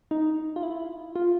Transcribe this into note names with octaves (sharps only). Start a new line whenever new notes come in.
D#4
F4
E4
F4